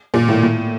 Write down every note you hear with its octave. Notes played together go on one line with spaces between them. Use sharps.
A#2
A2
A2